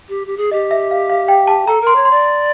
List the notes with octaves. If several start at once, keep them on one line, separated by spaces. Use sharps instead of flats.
G4
G4
G#4
G4 D#5
E5
F5
F5
G5
A5
A4 A#5
A#4
C6
C#5
C6
D5